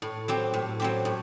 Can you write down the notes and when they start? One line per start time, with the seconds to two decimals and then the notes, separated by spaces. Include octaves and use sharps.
0.02 A2
0.28 F#3 C4 G4
0.54 A2
0.80 F#3 C4 G4
1.05 A2